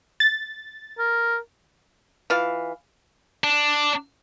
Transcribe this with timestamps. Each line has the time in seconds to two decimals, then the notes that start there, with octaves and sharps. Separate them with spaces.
0.20 A6
0.98 A#4
2.30 E3 F4 F5
3.44 D4